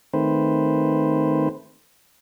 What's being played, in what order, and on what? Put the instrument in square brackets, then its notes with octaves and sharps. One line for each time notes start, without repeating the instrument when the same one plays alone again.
[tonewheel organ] D#3 A3 C4 B4 C5